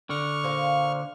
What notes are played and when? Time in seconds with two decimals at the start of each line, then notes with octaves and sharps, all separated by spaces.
0.10 D3 C#6 F6
0.43 A#2 C5 F5